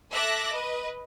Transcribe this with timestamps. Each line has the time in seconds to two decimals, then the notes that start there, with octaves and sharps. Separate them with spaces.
0.12 A4 E5 A5 D6 F#6 A#6
0.53 B4 D#5